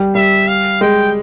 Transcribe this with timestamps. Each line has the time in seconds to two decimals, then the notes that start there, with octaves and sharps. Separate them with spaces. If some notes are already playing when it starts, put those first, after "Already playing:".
Already playing: G3
0.15 G3 E5
0.48 F5
0.81 G#3 G5